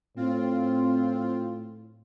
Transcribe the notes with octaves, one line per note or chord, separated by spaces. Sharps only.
A2 C4 F4